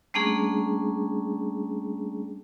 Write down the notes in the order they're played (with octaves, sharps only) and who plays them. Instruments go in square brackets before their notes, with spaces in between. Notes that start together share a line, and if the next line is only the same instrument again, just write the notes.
[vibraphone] G3 A3 A#3 C#4 D4 G#4